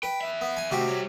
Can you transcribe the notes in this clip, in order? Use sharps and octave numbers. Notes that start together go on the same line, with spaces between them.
B4 G5
E2 E5
B3
G#5
C3 D#3 A3 F#4 G4
G3 C#5